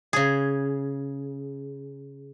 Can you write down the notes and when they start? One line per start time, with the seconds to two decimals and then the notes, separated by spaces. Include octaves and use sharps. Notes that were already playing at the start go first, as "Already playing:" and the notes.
0.13 C#3 G#4